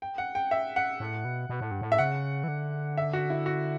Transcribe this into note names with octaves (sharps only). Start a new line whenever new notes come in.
G5
F#5
G5
E5
F#5
A2
B2
B2
A2
G2
A2
E5
C#3 F#5
E3
D3
E5
F#4
E4
F#4